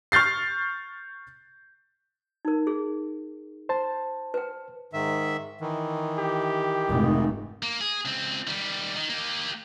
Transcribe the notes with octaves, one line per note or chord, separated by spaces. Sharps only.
C#6 F6 G6 A6 C7
D#4 A#4
G#4
C5 A5
B4 G5
G#2 D#3 E5
D#3 E3
G4
F1 G#2
A#3
G#4
C#2 C4
D#3 G3
D#3
A#3 G4